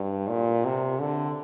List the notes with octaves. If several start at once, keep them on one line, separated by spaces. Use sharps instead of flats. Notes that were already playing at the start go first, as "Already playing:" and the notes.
Already playing: G2
A#2
C3
D3